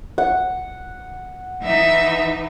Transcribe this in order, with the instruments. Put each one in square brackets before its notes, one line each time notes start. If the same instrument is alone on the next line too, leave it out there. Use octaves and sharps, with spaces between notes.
[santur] F#5
[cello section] E3 D#4 [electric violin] E5